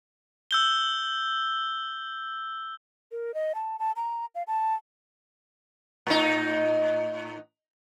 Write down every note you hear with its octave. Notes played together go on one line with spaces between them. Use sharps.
E6 G6 G7
A#4
D#5
A5
A5
A#5
F5
A5
A2 D#4